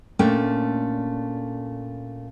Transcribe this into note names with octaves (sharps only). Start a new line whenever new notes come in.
A#2 A3 C#4 D4 G5